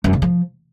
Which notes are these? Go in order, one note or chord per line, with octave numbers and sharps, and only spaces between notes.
F#2
C#3
F3